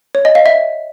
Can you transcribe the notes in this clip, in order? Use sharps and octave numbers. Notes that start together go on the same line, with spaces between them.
C#5
D#5
F5
E5